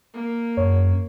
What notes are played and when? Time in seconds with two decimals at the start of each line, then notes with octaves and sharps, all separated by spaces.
0.14 A#3
0.57 F#2 C#5